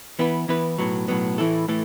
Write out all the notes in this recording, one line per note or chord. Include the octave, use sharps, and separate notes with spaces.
E3 B3 E4 B4
E3 B3 E4 B4
B1 A2 F#3 B3
B1 A2 F#3 B3
A2 E3 A3 E4 A4
A2 E3 A3 A4